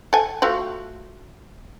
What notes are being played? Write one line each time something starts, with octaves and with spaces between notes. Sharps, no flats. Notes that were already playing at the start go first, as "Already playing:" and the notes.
A4 G#5
A3 F4 F#4